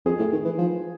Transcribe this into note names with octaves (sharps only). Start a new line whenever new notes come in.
F2 G#4
A2
D#3
E3
F3